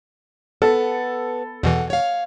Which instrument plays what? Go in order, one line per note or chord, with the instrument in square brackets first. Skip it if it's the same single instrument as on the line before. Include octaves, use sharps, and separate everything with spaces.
[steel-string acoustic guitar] B3 [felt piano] A4
[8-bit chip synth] E2 B2 E3 [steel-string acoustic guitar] F#5
[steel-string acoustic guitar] C#5 F5